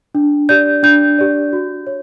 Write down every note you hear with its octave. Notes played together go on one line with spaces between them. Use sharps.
D4
G4 D5 G6
D4 G6
G4 D5
F#4
C#5